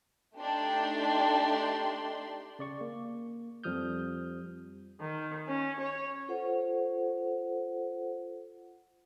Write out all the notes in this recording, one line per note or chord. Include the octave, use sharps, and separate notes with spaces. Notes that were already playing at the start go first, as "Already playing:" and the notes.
A3 D4 D#4 G4 G5 C6
C#3 D5 C#6
A#3
F2 F3 G3 D#6 F6 G6
D#3
C#4
C#5
F4 A4 C5 F#5